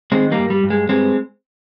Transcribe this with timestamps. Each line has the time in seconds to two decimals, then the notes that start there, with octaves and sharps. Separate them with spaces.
0.12 D#3 G#3 C4
0.31 G3 A#3
0.38 G2
0.50 G3
0.63 G2
0.70 G#3
0.89 G2 G#3 C4